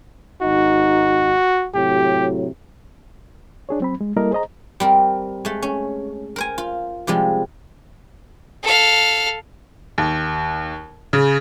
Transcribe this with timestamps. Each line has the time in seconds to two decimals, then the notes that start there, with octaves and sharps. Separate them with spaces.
0.42 G#1 D#4 F#4
1.75 A2 C3 F#3 G4
3.69 D4 G#4 C#5
3.80 F#3 C4 B5
4.01 G#3
4.16 G3 A#3 E4 A4 A#4 D#5
4.31 G#4 C5 D#5 A#5
4.80 G3 C4 A#4
5.45 G#3 A3
5.62 C#4
6.36 A#4 C5 G#5
6.58 F4
7.07 C3 F3 G3 G#3
8.63 A4 F5
9.98 D#2
11.13 C#3